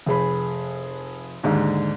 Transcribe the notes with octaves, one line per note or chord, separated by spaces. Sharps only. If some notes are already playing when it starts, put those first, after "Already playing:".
F1 G#4 B5
D#2 G#2 D3